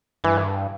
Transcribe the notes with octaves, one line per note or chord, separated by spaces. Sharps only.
G2 E3